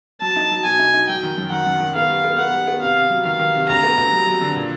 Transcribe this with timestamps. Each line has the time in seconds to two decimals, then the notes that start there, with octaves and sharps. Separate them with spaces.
0.21 F#3 A5
0.36 D#4
0.51 F#3
0.65 B2 G#5
0.79 D#4
0.94 D#4
1.09 F#3 G5
1.23 D#3
1.38 F#2
1.52 D#3 F#5
1.66 F#2
1.80 D#3
1.95 B3 F5
2.09 G3
2.24 B3
2.39 B3 F#5
2.53 G3
2.67 B3
2.82 C3 F5
2.96 C3
3.10 F#3
3.25 D#3 F5
3.40 D#3
3.55 C3
3.68 D2 A#5
3.83 B3
3.98 D2
4.12 F#3
4.27 F#3
4.41 D3
4.56 A#2